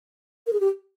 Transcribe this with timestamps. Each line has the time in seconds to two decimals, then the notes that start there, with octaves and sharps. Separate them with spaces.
0.47 A#4
0.53 G#4
0.60 G4